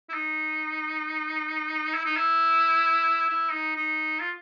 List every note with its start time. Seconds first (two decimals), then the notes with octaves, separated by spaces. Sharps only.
0.09 E4
0.13 D#4
1.94 E4
2.05 D#4
2.17 E4
3.29 E4
3.52 D#4
3.75 D#4
4.20 F4